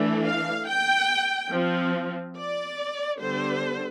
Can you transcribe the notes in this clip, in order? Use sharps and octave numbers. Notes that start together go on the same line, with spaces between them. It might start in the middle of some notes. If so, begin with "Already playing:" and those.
Already playing: E3 A3 D4
F5
G5
F3 C4
D5
D3 G3 B3 D4 C5